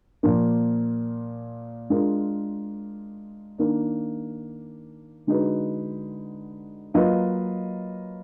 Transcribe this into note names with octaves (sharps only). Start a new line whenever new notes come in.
A#2 F3 A#3
G#3 D4 F4 A#4
D#3 A#3 D4
D3 G#3 D#4 F#4 B4
F#3 A#3 F4 B4 D#5